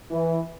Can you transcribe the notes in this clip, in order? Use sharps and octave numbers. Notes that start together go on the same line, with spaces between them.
E3